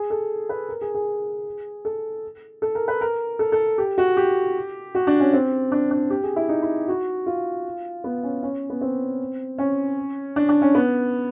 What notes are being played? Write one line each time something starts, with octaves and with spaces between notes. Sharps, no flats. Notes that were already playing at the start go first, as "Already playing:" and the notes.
Already playing: G#4
A4
B4
A#4
G#4
G#4
A4
A4
A#4
B4
A#4
A4
A4
G4
F#4
G4
F#4
D4
C#4
C4
D4
D4
G4
G#4
E4
D#4
E4
F#4
F4
B3
C#4
C#4
B3
C4
C#4
D4
D4
C#4
B3